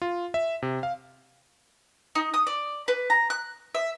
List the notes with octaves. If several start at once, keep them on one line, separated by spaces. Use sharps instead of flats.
F4
E5
C3
F5
D#4
D#6
D5
B4
A#5
F#6
E5